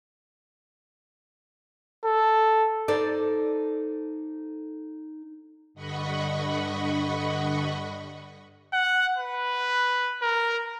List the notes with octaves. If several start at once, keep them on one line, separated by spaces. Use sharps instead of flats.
A4
D#4 A4 C5 D5
G2 D3 D#5 F#5 B5 C#6
F#5
B4
A#4